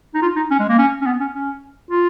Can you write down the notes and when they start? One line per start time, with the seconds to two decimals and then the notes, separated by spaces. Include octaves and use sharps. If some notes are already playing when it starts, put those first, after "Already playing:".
0.14 D#4
0.22 F4
0.36 D#4
0.51 C#4
0.60 G#3
0.69 A#3
0.78 C#4
1.01 C#4
1.06 B3
1.20 C#4
1.34 C#4
1.90 F4